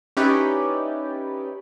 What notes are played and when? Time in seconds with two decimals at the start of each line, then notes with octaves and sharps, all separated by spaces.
0.17 C#4 D#4 E4 G4 B4 D5